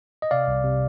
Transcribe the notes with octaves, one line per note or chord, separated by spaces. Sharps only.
D#5
C3 D5 F5
C2
C3